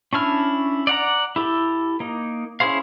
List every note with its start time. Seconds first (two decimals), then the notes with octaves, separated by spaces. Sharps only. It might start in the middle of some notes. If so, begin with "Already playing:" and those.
0.13 C#4 D4 E4 F6
0.87 D5 F#5 A#5
1.36 E4 G4 A4
2.00 A#3 D#4
2.60 C#4 E4 G#4 C5 F5